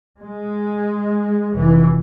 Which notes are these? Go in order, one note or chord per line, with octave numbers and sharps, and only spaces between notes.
G#3
F1 E3